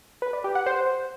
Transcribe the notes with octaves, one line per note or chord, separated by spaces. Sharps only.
B4
D5
G4
F#5
C5